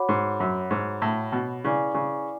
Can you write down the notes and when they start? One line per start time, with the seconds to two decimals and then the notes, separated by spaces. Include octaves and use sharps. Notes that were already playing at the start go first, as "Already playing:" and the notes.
Already playing: F#4 C#5 F#5 B5 D6
0.09 G#2
0.40 F#2
0.71 G#2
1.02 A2
1.32 B2
1.64 C#3 E4 B4 D5 G#5 D6
1.94 C#3